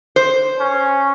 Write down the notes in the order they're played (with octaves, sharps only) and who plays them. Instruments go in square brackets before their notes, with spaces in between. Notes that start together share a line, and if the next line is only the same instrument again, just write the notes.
[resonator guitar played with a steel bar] C5
[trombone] C#4